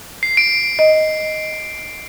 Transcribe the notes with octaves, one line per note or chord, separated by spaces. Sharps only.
C7
D7
D#5